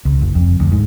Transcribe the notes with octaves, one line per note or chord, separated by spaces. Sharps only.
C#2
F#1
F2
D2
G#2